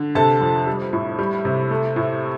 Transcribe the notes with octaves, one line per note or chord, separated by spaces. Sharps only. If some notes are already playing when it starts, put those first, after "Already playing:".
Already playing: D3
C3 A4 A5
F2
G3
A2
G3
C3
A3
A2